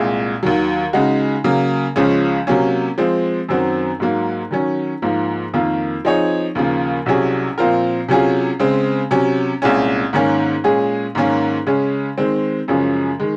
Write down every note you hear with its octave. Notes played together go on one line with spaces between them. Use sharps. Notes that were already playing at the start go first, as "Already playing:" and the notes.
Already playing: C2 A#2 G#3
D#2 D#3 F#3
C#3 G#3 D#4 F#4
C#3 F#3 A#3
C#2 C#3 F3 G#3 C#4
C3 F#3 A#3 C#4
F3 G#3 C4
F#2 D#3 F#3 C4 F#4
G#2 F#3 A#3
D#3 F#3 C#4
G#2 F3 A#3
F2 D#3 A#3 F4
F3 C4 D#4 G#4 C#5
D#2 C#3 F3 A#3
C2 C3 F#3 C#4 G#4
A#2 F3 C4 F4 A#4
C3 F#3 C#4 F4 G#4
C#3 G#3 C4
C3 F#3 C#4
C2 A#2 G#3 C#4
G#2 D#3 A#3 C#4
A#2 G#3 C#4 G#4
G#2 D#3 A#3 C#4
C#3 G#3 C#4
D#3 G#3 C4
F#2 C#3 F3 G#3 C#4
D#3 G#3